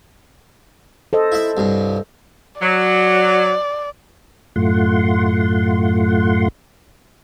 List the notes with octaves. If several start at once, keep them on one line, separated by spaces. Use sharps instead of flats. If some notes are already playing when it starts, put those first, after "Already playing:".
A4 C5 D#5
E4 E5
C2 G2
F#3 D5
F#2 A2 A3 F4 F#5 C6